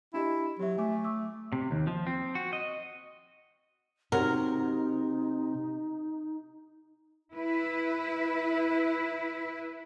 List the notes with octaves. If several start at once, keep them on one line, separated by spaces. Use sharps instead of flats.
D4 E4 G4 D#5
F#3 G4 E5
A3 G#5 D6
C#6 D6 E6
C3
D#2
F3
C4
F#4
D#5
C3 F#3 D#4 A#4
E4 B4